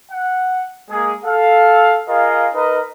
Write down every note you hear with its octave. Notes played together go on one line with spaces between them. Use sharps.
F#5
G#3 A#3 G#4
A4 F5
F4 G#4 A#4 D#5 F5
D#4 A#4 B4 D#5